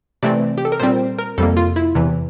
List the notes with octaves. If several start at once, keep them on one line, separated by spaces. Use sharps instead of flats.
C3 E3 A3 C4 D5
G4
A4
A#4
A#2 G3 C4 C5
A#4
F2 C3 G3 A#3 A4
F4
E4
E2 C3 E3